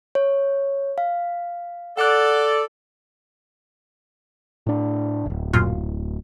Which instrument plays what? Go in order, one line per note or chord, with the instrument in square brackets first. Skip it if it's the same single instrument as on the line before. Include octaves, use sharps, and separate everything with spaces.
[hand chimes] C#5
F5
[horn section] A4 D5 [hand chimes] F#5 F#6
[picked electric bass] A2 D4
D1 G1
[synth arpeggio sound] F#2 A#2 F4